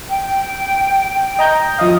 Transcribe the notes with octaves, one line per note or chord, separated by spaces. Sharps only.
G5
D#5 A#5 G6
F3 D#5 F5 D#6